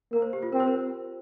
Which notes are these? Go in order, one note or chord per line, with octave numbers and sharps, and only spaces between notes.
A#3 A#4
C5
G4
F4
C4 A#4
C5
A#4